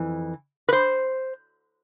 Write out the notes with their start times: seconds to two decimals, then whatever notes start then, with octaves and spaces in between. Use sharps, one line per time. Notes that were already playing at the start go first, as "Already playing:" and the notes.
Already playing: F2 E3
0.69 B4
0.73 C5